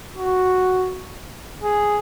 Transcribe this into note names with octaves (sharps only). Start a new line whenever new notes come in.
F#4
G#4